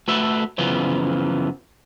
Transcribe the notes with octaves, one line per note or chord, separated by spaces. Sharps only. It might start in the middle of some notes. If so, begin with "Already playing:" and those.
A3 F#4 A4 B4 E5
F#2 C#3 E3 F3 B3